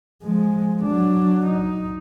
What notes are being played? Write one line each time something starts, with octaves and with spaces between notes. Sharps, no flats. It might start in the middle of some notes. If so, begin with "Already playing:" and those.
F3 G#3
F#3 D4
D#4